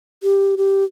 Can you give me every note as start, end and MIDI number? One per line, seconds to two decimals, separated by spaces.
0.23 0.55 67
0.57 0.84 67